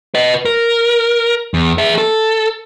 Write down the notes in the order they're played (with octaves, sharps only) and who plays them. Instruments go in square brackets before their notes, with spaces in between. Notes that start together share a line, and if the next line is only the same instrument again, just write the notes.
[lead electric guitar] B4 D#5
A#4
E2
G#4 E5
A4